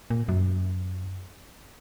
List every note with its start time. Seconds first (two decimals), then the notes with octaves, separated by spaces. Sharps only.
0.10 A#2
0.29 F#2